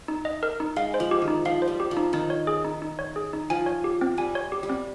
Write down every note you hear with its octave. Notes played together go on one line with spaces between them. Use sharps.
D#4
D#5
A#4
D#4
G#3 F5
C5
F3
G4
D#3
D#4
F3 F5
C5
G3
G4
F3
D#4
D#3 D#4
C#5
G#4
D#4
D#4
C#5
G#4
D#4
F3 G#5
C#5
G4
C4
G3 G#5
C#5
G4
G3
C4